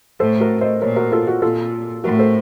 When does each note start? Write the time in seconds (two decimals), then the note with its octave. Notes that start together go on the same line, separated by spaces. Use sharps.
0.20 A2 A4 C5
0.40 F#4 A#4
0.61 C5 D#5
0.81 A#2 A#4 C#5
0.96 F#4 A#4
1.12 F4 A4
1.27 F#4
1.42 A#2 F4 A4
2.04 A2 F#4 A#4
2.19 A4 C5